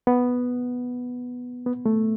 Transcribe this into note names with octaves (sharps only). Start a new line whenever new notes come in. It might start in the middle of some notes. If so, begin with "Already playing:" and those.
B3
B3
A3